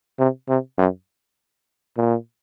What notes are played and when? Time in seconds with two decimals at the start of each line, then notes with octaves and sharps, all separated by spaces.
0.19 C3
0.49 C3
0.78 F#2
1.97 A#2